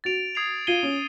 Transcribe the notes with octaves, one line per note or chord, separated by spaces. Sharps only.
F#4 A6 D7 F7
D#6 G#6 C7 F7
F4 G#6 C7 D#7 G7
C#4